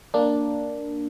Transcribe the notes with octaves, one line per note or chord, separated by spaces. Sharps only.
A#3 D4